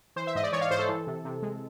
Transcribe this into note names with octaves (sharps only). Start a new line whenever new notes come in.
E3 C5
E5
G#2 D#5
D5
E3 C#5
F5
G#2 C5
A4
E3
C3
C3
G#3